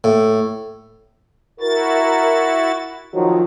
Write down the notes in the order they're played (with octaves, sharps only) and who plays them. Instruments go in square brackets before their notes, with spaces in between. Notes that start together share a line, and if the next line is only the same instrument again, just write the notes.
[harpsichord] A2
[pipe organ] E4 F#4 A6 [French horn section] A#4
[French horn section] D#3 F3 F#3